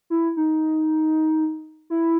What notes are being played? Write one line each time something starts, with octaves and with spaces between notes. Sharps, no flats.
E4
D#4
E4